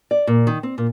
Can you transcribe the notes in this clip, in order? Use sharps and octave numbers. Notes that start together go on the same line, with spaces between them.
D5
A#2
D#3
C4
A#2